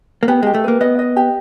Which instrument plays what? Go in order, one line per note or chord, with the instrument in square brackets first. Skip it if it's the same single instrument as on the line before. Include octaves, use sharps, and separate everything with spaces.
[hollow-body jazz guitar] A#3
[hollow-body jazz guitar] B3 [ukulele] G4
[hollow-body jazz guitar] G#3 [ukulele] G4
[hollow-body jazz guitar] A3
[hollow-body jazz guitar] A#3 [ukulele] B4
[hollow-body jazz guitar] B3 [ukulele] D#5
[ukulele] D#5
G4